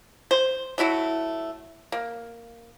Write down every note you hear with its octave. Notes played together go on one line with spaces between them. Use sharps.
C5
F#3 A3 E4 F#4
A#3